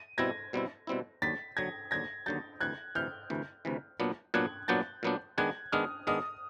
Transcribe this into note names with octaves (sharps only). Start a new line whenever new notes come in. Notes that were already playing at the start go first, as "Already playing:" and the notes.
Already playing: D#7
B2 G3 C4 E4 G#6 A#6
B2 G3 C4 E4
B2 G3 C4 E4
D#2 D3 F#3 A6 B6
D#2 D3 F#3 G#6 A#6
D#2 D3 F#3 G#6 A#6
D#2 D3 F#3 G6 A6
D2 C3 E3 F#6 G#6
D2 C3 E3 F6 G6
D2 C3 E3
D2 C3 E3
A#2 F#3 B3 D4
A#2 F#3 B3 D4 F#6 G#6
A#2 F#3 B3 D4 G6 A6
A#2 F#3 B3 D4
D#3 G#3 B3 D4 F#6 G#6
D#3 G#3 B3 D4 D#6 F6
D#3 G#3 B3 D4 D#6 F6